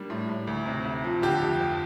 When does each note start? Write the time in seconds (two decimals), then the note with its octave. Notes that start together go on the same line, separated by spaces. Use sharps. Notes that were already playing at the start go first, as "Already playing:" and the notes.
Already playing: G3 A#3 D4
0.10 A2
0.29 A2
0.47 D2
0.66 C3
0.85 D2
1.04 F3
1.22 D3 G4
1.42 F2
1.60 F2